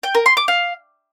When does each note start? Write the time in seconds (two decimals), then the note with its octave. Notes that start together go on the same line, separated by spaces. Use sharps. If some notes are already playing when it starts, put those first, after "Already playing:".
0.03 G5
0.15 A#4
0.26 C6
0.37 D6
0.48 F5